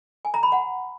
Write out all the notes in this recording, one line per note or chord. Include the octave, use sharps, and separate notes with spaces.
G#5
A#5
B5
F#5